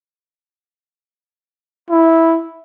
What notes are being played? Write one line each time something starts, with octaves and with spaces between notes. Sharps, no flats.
E4